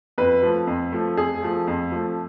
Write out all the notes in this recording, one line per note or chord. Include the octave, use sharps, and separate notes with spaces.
F2 B4
F3 A3
F2
F3 A3
F2 G#4
F3 A3
F2
F3 A3